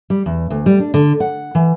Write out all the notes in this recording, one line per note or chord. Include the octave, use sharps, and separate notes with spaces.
G3
E2
D2
G3
D4
D3
F#5
E3